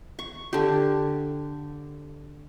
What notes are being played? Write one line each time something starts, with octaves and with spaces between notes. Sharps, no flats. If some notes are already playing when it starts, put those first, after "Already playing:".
C#6
D3 G4